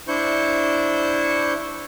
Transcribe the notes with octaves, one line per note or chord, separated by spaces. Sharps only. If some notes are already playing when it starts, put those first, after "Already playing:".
D4 E4 C5 C#6 G6